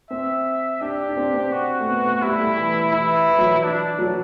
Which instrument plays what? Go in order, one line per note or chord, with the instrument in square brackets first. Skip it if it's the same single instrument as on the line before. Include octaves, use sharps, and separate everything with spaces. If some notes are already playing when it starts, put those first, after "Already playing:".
[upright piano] C4 [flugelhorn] E5
[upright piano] D4 [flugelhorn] G4
[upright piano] D4
C4
C4
[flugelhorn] F#4
[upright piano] A3
B3
A3
[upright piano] G3 [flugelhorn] E4
[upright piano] A3
E3
[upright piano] E3 [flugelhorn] E4
[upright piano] E3
F#3
E3
[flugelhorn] D4
[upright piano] F#3